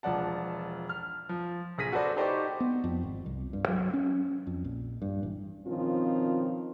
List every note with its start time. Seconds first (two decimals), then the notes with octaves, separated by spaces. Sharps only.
0.03 E1 F3 D5 F#5 A5
0.89 F6
1.29 F3
1.78 A#1 G#4 A#6 B6 D#7
1.92 F#4 A4 B4 C5 D5
2.16 D#4 G4 C5 D5 C#6 D6
2.60 B3
2.84 F2
3.03 G#1
3.26 C2
3.53 G2
3.68 F#3
3.94 C#4
4.47 F2
4.64 A#1
5.02 G2
5.23 A1
5.66 B2 D#3 F3 C4 C#4 F4